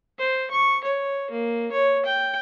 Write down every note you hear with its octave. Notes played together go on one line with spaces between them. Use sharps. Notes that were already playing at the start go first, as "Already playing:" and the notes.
C5
C#6
C#5
A#3
C#5
G5